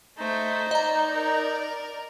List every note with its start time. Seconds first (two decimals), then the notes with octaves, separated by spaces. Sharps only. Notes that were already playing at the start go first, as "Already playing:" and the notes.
0.18 A3 D#4 C5
0.71 D5 D#5 A#5
1.14 A#4